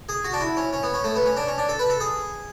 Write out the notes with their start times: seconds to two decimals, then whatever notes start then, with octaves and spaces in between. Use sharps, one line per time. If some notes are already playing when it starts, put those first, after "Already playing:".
0.09 G#4
0.24 F#4
0.33 D4
0.41 E4
0.57 C#4
0.73 C#4
0.83 B3
0.94 C#4
1.04 A3
1.16 B3
1.26 C#4
1.37 D4
1.47 C#4
1.58 D4
1.69 A4
1.79 B4
1.90 A4
2.00 G#4